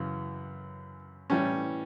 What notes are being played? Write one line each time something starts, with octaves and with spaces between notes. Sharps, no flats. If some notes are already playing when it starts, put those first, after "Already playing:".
Already playing: F#2 C#3 E3
A2 E3 G3 C#4